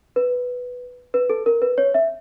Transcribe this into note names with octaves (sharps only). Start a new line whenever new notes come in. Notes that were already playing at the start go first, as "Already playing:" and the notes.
B4
B4
A4
A#4
B4
C#5
E5